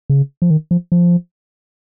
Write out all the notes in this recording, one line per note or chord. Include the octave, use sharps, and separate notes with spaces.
C#3
F3
D#3
F3
F3